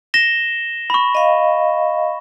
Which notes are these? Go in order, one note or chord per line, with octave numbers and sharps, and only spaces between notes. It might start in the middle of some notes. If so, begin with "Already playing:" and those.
A#6 E7 G7
B5 C#6
D#5 F5